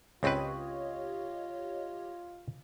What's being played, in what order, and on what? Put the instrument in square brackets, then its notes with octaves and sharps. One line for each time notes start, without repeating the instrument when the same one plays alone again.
[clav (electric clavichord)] C#2 C4 B4 [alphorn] F4 [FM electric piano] G4 C#5 D#5